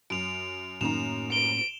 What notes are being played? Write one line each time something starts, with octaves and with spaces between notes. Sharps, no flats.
F#2 D7 F7
F#2 A2 D#3 A#3 C#4 A#5 E7 F7
D7 G7